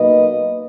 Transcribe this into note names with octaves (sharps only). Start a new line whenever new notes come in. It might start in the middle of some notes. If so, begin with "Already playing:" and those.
Already playing: B2 F#3 A#3 D#4 B4 D#5